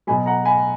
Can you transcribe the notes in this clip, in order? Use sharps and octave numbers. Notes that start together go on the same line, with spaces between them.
B2 F#3 G#5 B5
F#5 A#5
G#5 B5